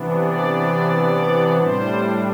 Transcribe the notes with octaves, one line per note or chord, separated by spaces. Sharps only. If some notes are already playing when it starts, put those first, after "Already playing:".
Already playing: C3 E3 B3 D4
D5
A2 G3 D4 C5